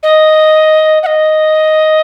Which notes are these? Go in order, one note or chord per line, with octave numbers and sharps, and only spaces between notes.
D#5
F#5
D#5